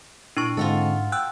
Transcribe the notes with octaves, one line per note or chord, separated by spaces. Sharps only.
A#2 D4 E4 C#6
G#2 D3 G#3 C4 F4 F#4 A4
G5 E6 F#6